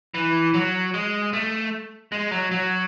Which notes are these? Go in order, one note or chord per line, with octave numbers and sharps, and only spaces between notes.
E3
F#3
G#3
A3
G#3
F#3
F#3